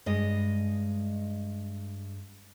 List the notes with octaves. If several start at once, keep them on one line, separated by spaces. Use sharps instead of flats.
G2 G#3 D#5